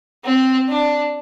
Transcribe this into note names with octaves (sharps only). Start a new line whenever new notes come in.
C4
D4